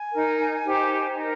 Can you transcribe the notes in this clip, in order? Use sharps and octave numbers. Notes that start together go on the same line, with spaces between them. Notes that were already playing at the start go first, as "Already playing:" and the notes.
Already playing: G#5
D#4 A#4
D#4 G4 C5
D#4 A#4 D#5